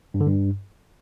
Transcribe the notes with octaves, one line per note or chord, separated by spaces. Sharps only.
G2
D3
G2